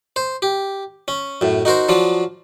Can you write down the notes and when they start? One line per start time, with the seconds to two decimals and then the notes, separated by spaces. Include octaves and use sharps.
0.16 C5
0.42 G4
1.08 C#4
1.41 F#2 A2
1.65 D#4 F#4 A#4 C5
1.89 F3 F#3 D4 F4